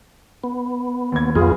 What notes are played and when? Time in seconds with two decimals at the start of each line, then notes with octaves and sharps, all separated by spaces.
0.44 B3
1.12 D#2 G#6
1.35 B1 F2 B3 F4 G#4